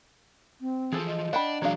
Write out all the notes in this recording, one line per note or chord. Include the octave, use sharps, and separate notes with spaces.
C4
E3 F3 G#4 A4
D#5
D4 F#5 G5 B5
E3 F#3 D4 F#4 G#4 F5